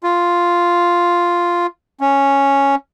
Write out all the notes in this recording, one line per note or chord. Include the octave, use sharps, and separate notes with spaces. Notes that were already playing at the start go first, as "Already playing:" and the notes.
F4
C#4